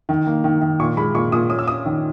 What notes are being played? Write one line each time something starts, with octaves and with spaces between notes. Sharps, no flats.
D#3
A#3
D#3
D#3
A#2 C#6
G#3 B5
A#2 C#6
A#2 D#6
C#4 D#6
E6
C#4 D#6
D#3